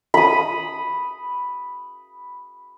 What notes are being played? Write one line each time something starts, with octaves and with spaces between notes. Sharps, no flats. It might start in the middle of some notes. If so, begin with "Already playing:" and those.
B5 D#6